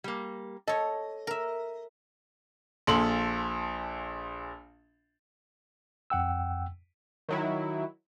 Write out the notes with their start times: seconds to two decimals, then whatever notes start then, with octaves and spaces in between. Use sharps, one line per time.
0.04 G3 A#3
0.67 A4 C#5 D#5
1.27 A#4 E5
2.87 A#1 A#2 A4 C6 F#7
6.10 F2 F#5 G5 E6
7.29 D#3 F#3 E4